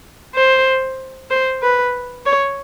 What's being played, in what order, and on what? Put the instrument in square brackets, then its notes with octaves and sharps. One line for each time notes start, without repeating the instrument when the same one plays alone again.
[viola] C5
C5
B4
C#5